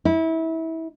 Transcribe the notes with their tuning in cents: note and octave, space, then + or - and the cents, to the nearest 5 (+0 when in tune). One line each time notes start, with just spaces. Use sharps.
E4 -25